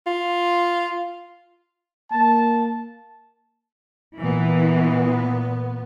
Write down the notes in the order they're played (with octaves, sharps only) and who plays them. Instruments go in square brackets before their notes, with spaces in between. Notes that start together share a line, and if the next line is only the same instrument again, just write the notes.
[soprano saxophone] F4
[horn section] A#3 A5
[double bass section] A#2 B3 [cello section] E3